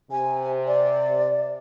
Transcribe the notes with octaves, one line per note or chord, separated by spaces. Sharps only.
C3 G#5
D5